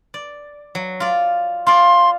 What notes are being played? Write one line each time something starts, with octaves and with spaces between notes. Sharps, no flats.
D5
F#3
F4 D5
F4 D5 C6